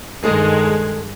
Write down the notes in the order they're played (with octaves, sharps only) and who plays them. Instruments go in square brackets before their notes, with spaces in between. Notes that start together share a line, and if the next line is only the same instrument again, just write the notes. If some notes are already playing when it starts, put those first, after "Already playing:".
[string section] G2 D#3 G#3 [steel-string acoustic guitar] G#4 A4 D#5